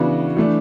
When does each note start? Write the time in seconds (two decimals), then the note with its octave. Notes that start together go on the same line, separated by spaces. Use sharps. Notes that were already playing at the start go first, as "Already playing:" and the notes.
Already playing: C#3 E3 B3 D4 F#4
0.37 E3 A3 D4